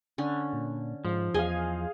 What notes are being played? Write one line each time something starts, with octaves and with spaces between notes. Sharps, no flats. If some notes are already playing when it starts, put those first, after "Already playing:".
D3 C#4
A#2
G#2 F3
E2 G#4 D#5 F5 G#5